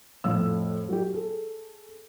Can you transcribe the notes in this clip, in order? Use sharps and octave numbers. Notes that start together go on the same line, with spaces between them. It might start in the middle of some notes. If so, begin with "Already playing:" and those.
F2 A2 F3 A3 F5 E6
F#3 G4
G#4 A4